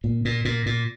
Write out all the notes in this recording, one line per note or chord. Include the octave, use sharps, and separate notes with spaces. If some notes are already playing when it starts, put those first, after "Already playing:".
A#2
A#2
A#2
A#2